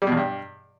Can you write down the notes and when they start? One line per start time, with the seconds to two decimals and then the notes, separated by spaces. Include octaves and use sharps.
0.02 G3
0.07 B2
0.12 E2
0.17 G2